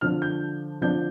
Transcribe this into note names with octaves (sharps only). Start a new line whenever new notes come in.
D3 F3 D4 F6
G6
D3 F3 D4 G6